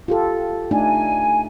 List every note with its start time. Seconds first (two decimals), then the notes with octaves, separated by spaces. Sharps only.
0.08 F4 G4 A4
0.71 A3 D4 D#4 G#5